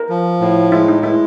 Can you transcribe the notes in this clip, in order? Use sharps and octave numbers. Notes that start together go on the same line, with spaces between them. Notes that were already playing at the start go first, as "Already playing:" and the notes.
Already playing: A#4
F3
A2
G#3 E4
D#4
G#3 E4